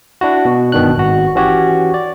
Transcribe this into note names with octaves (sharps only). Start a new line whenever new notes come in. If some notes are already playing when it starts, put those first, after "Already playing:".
D4 E4 F#4
B2
G1 B2 D#3 D4 F#6
G#1 F#4
E3 C#4 F#4 G4 C#5
D5